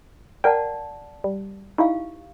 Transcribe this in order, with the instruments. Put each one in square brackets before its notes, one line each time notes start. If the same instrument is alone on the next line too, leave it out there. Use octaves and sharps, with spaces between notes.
[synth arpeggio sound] A#4 G5 [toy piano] D5 F#5 A5
[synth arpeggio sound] G3
[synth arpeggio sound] D#4 E4 [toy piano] G4 F5